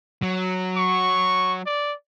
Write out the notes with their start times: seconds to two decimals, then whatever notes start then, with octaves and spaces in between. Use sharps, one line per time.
0.22 F#3
0.77 C#6
1.66 D5